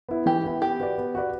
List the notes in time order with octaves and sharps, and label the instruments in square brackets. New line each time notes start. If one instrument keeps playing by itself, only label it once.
[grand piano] B3 E4
[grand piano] E3 [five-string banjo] G4
[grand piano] B3 E4
[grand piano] B3 [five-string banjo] G4
[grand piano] F#4 B4 D5
B3
F#4 B4 D5